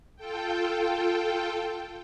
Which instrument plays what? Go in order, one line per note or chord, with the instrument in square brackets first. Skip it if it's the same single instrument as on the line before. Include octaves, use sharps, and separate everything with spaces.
[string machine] F4 A4 G5